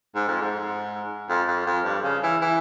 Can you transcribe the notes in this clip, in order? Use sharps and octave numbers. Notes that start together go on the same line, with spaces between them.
G#2
F2
G#2
F2
F2
F2
G2
C#3
E3
E3